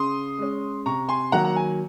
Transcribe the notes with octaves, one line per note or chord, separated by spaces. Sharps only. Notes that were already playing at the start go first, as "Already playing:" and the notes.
Already playing: C#3 C6 D#6
G#3 C#4
C3 A#5 C#6
G#5 C6
D#3 F#3 A#3 F#5 A#5
A#5
G#5